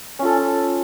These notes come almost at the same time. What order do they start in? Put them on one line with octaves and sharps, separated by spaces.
C#4 F4 A4